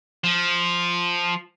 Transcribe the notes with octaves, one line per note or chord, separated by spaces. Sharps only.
F3